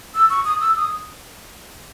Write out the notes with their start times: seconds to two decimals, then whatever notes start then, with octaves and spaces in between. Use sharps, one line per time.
0.15 E6
0.30 C#6
0.45 D#6
0.60 E6
0.76 D#6